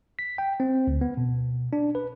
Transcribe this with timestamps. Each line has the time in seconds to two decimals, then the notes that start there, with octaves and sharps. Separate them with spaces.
0.19 B6
0.38 G5
0.60 C4
0.87 D2
1.01 B3
1.17 B2
1.73 D4
1.95 B4